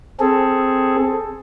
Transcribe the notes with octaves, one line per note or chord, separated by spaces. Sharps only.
C4 G#4 A4